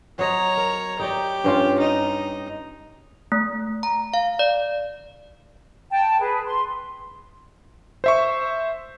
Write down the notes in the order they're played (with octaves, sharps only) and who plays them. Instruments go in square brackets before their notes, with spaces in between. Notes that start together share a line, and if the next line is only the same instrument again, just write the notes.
[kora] F#3 C5 D#5 [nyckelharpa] C#5 A#5
[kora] A#4
[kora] D#4 C#5 D5 [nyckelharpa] G4
[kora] G2 C#4 F4
[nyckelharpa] D#4
[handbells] A3
A#5
F5
D5
[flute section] G5 A5
G#4 B4
C6
[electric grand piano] C5 E5 C#6